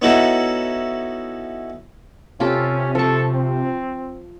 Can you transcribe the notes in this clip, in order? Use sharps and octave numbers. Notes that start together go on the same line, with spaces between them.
B3 C#4 D#4 E4 F#4 A4
C3 C#4 F4 G4 A4
F3 A4 C#6
C4